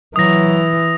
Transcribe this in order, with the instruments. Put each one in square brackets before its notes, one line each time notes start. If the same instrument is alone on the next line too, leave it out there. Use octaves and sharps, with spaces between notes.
[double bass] E3 [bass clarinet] F#3 [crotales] D#6 A#6